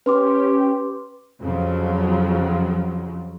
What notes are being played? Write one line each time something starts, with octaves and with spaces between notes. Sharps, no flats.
C#4 G4 B4 C6 D6
F2 C#3 F3 F#3